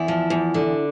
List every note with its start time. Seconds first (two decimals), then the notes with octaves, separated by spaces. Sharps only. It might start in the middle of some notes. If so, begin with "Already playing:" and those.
Already playing: E2 E4
0.08 F3
0.30 E2
0.54 D3